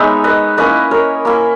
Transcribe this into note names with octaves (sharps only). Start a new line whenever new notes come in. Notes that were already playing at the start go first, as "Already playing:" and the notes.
Already playing: G#3 B3 D#4 C#5 E5
B4 D#5
A#3 C#4 E4 B4 D#5
A#4 C#5
A#3 C#4 E4